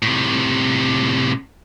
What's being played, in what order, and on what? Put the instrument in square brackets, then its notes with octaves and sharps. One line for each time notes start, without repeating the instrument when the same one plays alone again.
[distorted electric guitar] A2 C3